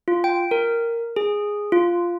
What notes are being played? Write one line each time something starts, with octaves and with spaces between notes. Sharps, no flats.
F4
G5
A#4
G#4
F4